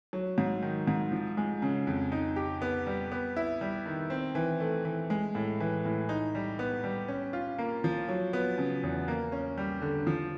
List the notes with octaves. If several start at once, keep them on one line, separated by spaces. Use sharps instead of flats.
F#3
G#2
D#3
G#2
F3
G#3
C#3
F2
D#4
G4
B3
G3
B3
E4
G3
D#3
C4
E3
A3
E3
G#3
A2
E3
A2
D#4
G3
B3
G3
C#4
F4
A#3
F3
F#3
B3
C#3
E2
A#3
C#4
G3
D3
F3